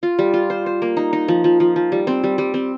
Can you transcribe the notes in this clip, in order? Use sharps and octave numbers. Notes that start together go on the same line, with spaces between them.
F4
G3
F4
C5
C5
A#3
D#4
D#4
F3
F3
F3
F3
G3
C4
G3
G3
C4